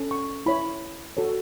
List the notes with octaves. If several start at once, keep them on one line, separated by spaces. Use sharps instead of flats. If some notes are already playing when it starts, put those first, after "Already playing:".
Already playing: C#4 A4
C#6
E4 C#5 B5
F#4 A4 C#5